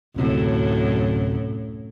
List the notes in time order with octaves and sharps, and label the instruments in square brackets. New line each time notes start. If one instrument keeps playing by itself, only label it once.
[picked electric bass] D1 C3 [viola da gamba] F#2 A2